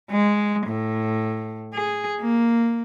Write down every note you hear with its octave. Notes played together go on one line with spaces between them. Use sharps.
G#3
A2
G#4
A#3